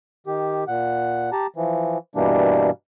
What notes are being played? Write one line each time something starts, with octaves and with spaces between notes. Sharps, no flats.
D#3 G4
A#2 F#5
G4 A5 A#5
E3 F3
G2 B2 E3 G3 A#3 D4